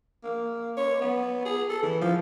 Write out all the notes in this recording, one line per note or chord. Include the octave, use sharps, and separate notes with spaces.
A#3
C#5
B3
G#4
A4
E3
F3